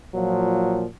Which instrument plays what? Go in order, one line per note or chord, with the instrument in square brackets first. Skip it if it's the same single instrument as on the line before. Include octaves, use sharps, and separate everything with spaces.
[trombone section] A#2 F3 F#3